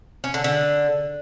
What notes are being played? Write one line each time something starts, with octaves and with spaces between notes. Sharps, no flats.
C#4
D3
D3